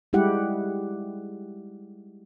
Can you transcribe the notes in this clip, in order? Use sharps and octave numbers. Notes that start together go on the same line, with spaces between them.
G3 G#3 E4 G4 F#5